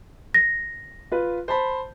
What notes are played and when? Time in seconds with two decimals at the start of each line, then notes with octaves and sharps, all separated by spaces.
0.34 A#6
1.12 F4 B4
1.48 C5 A5 B5